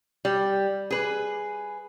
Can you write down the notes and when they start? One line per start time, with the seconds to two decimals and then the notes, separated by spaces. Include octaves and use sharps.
0.25 G3
0.91 G#4 B4